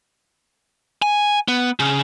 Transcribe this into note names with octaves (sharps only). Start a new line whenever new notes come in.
G#5
B3
C#3